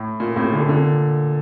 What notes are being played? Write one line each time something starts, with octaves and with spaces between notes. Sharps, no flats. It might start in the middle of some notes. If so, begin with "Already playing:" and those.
Already playing: A2
A#2
A2 C3
A#2 D3
A#2 D3